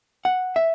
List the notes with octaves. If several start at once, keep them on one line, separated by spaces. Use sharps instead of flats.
F#5
E5